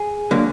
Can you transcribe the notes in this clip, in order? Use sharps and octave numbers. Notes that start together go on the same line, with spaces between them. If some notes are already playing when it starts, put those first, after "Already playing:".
Already playing: G#4
D3 F#3 A#3